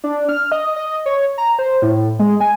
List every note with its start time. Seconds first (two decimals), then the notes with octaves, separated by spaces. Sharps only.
0.04 D4
0.29 F6
0.52 D#5
0.76 D#5
1.06 C#5
1.38 A#5
1.59 C5
1.82 A2
2.19 G#3
2.40 G#5